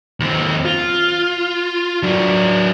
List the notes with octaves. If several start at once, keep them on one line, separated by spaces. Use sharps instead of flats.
D#2 C4
F4
F#3 D4